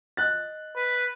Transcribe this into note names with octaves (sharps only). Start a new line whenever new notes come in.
D#5 F#6 A6
B4